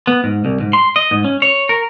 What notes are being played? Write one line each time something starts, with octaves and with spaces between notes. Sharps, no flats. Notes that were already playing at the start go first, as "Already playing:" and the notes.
B3
G#2
C2
G#2
C6
D#5
G#2
C#4
C#5
A#4